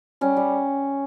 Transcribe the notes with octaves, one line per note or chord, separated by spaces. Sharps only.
G3 C#4
G3